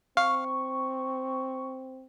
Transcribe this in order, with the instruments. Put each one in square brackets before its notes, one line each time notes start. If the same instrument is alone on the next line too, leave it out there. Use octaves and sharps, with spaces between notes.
[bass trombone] C4 [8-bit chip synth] F5 [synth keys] C#6